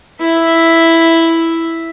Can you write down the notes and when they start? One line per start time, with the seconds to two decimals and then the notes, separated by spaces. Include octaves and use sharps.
0.21 E4 E5